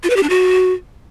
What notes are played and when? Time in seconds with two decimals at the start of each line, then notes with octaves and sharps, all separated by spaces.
0.03 F4
0.10 B4
0.16 G4
0.23 D4
0.30 F#4